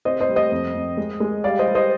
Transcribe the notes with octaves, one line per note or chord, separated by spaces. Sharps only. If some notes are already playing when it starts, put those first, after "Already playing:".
C3 C5 D#5
C5 D#5
G3
C5 D#5
F2
F2
G#3
G#3
G3 D5 F5
C5 D#5
G3
C5 D#5